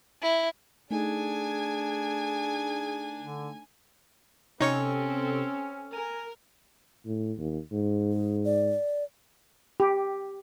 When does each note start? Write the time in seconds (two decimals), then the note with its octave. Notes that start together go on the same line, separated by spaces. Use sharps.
0.22 E4
0.91 A3 D4 D#4 G#4 A4 G#5
3.19 D3
4.60 C3 C4 C#4 D#4 A4 C#5 C#6
5.93 A#4 G#5
7.06 A2
7.38 D#2
7.72 G#2
8.12 G#4
8.45 D5
9.80 G4